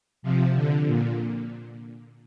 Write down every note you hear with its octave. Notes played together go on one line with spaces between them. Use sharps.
C3 F3
D3
A#2